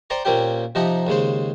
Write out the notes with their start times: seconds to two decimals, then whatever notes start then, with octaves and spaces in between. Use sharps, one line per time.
0.10 C5 D5 G5 A#5 C#6
0.25 A#2 A#3 C4 C#4 G4 G5
0.75 C3 F3 D#4 G4 F#5 A#5
1.07 D#2 C#3 G#3 C5